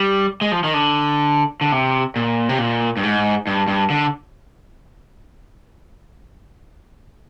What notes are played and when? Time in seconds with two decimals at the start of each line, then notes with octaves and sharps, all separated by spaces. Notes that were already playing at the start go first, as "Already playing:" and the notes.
Already playing: G3
0.41 G#3
0.52 F3
0.64 D#3
0.74 D3
1.61 D3
1.72 C3
2.16 A#2
2.49 C3
2.59 A#2
2.97 G2
3.03 G#2
3.47 G2
3.68 G2
3.90 D3